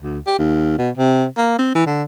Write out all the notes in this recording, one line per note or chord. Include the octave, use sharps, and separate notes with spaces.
D2
G4
D#2
B2
C3
A#3
C4
E3
D3